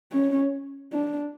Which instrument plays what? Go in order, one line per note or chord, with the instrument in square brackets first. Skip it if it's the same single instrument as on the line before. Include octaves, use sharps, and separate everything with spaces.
[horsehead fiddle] C#4
D4